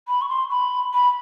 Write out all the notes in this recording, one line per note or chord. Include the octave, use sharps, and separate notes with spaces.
B5
C#6
C6
B5
B5